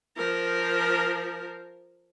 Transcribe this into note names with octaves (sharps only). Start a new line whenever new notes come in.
F3 A#4